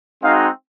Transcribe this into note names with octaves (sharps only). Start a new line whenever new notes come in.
G#3 C4 D#4 F#4 F5